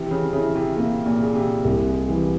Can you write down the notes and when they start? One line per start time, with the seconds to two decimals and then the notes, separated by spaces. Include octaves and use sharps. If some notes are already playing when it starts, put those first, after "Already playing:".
Already playing: C3 E3
0.11 C#3
0.33 C#3 E4
0.55 C3
0.77 C3 A#3
1.06 A#2
1.21 G#4
1.35 C3
1.64 C2 G3
1.86 G#3
2.08 E3 G3